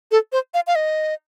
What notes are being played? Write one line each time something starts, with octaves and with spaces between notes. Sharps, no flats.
A4
C5
F5
F5
D#5